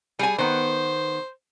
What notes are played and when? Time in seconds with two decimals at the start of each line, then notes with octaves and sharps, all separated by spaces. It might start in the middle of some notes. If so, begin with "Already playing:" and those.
0.19 G3 G#4 G#5
0.38 D#3 B3 C5